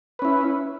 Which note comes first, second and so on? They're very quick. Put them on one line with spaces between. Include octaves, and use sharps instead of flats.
B4 C#4 E4